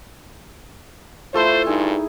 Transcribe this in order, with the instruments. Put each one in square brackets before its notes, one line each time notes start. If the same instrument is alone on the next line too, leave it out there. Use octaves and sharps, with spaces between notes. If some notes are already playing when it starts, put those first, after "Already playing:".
[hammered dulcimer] A3 E4 [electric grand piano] F4 A4 C6 [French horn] C5
[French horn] G2 [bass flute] D#4 [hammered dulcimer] G#4